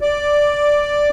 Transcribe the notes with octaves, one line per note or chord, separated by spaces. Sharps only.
D5